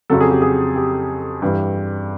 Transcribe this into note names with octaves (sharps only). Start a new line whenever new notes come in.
F2 C#3 F#3 A4
G#4
G4
G#4
G4
G2 E3 G3